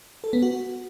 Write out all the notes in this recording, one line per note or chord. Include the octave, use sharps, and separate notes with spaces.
A4
B3
F#4